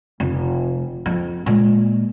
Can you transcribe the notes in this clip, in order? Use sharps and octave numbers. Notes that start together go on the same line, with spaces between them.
F1
F2 F3
A#2 G#3